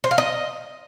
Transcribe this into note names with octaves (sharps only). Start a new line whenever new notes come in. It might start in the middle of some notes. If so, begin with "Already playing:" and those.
C5
F5
D#5